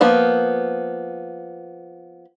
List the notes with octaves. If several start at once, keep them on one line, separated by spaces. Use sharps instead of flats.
F3 A#3 B3